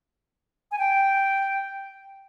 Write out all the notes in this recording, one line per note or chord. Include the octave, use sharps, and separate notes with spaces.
G#5
G5